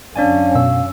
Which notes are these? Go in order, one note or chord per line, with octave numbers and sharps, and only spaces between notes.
F#2 D3 C#4 D4 D5 F5 G#5
B2 E6